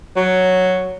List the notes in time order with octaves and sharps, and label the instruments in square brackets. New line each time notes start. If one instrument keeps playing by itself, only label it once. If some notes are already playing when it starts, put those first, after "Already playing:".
[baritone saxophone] F#3